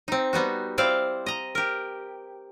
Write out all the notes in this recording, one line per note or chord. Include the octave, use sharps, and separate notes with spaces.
C4 D#4
G3 B3 D#4 F#4
C4 E4 C5 D5 F5
D#5 A#5
G4 A#4